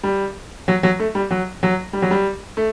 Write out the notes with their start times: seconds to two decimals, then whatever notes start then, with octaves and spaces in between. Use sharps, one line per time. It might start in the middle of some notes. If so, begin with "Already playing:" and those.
0.03 G3
0.68 F#3
0.83 F#3
0.99 A3
1.15 G3
1.31 F#3
1.63 F#3
1.93 G3
2.02 F#3
2.11 G3
2.57 A3